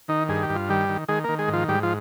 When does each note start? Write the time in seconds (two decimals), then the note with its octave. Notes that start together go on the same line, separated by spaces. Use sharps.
0.08 D#3 D#4
0.29 G2 G#4
0.43 G4
0.49 G2
0.56 F4
0.69 D#3 G3 G4
0.89 D#3
1.08 D#3 G#3 G#4
1.24 D#3 A#3 A#4
1.39 G#3 G#4
1.48 G#2
1.53 F3 F4
1.69 G#2 G3 G4
1.83 F3 F4